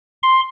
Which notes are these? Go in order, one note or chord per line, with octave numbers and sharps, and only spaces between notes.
C6